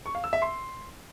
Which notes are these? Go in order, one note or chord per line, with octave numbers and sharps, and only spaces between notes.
C#6
F5
E6
E5
C6